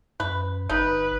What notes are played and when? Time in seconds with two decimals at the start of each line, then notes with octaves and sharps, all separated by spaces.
0.20 F#2 B4
0.69 G1 D#4 B4